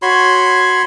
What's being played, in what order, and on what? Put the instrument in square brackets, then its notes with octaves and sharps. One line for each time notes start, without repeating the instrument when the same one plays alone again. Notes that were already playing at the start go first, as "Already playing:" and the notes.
[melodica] F#4 C#5 B5 C6